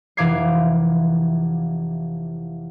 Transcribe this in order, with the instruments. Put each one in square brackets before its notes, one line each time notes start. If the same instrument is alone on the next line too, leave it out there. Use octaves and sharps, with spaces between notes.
[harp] F1 E3 F5 D6 G#6 C7